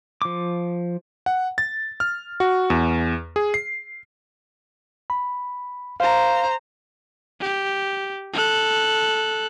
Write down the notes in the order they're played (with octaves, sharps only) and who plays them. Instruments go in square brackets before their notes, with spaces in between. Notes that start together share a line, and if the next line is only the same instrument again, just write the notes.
[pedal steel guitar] F3 D6
[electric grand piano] F#5
A6
F6
F#4
E2
G#4
C7
[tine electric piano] B5
[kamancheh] C5 A#5 [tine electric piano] F5
[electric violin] G4
A4 F#6